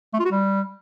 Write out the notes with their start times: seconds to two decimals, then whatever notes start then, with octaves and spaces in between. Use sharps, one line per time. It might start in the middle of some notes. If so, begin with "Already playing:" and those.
0.14 A3
0.19 F4
0.25 F#4
0.31 G3